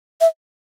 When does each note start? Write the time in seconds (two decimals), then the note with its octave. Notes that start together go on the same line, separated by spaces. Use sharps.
0.21 E5